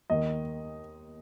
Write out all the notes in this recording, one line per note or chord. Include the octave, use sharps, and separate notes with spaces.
D#2 D#3 D#5